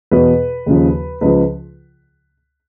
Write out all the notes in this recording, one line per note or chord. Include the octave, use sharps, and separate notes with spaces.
E2 B2 B4
D#2 C#3 F3
C#2 C#3 F3 B4